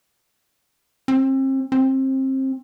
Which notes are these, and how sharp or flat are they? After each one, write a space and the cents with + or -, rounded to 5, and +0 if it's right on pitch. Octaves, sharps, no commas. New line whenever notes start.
C4 +35
C4 +25